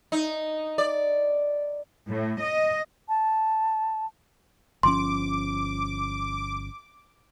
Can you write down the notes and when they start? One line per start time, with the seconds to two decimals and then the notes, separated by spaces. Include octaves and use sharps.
0.12 D#4
0.78 D5
2.07 A2
2.38 D#5
3.09 A5
4.83 G1 F3 C#4 C6 D6